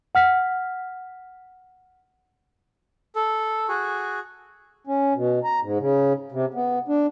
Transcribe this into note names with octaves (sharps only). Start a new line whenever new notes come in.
F#5 F6 B6
A4
F#4 G#4
C#4
B2
A#5
G#2
C#3
C3
B3
D4